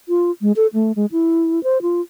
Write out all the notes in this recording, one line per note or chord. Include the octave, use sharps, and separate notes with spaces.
F4
G#3
A4
A3
G#3
E4
C5
F4